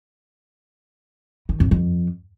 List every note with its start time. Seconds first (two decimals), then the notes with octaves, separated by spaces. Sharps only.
1.49 D#3
1.60 F2
1.71 F2